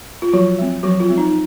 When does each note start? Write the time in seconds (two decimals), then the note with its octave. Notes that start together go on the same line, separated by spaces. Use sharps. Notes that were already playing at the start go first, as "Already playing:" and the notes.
0.22 F4
0.33 F3 F#3 F#4
0.59 G#3 C4
0.83 F3 F#3 F#4
1.00 F4
1.09 G#3 C4
1.18 D#4